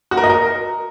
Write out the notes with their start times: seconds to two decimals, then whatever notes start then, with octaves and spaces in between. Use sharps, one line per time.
0.11 F#4
0.17 A#4
0.24 D#5
0.30 A#4